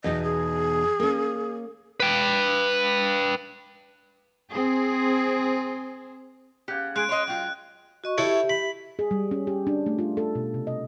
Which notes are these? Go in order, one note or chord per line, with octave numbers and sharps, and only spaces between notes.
E2 B2 D#4 D#5
G#4
A#3 C#4
B4 G5
C4 G#4
C#3 G4 F#5
G#3 G#4 F#6 D7
C#5 D#5 C6
F#3 F4 G5
F#4 D#5 C#6
E4 G4 A4 C#5 E5
B5
G#4
G3
C#4
G4
D4
A3
F4
A4
B2
C3
D#5